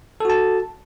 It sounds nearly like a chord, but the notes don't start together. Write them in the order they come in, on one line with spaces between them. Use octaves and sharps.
A4 F#4 A5